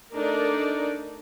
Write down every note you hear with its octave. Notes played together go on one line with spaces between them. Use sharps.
A3 D4 D#4 A#4 D5